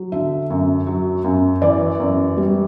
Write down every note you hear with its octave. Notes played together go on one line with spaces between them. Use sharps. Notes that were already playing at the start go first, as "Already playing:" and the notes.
Already playing: F#3
D3 E5
F#2
F#3
F#2
E3 D5
F#2
G3